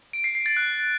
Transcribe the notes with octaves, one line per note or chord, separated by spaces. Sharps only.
D7
C7
C7
A6
F#6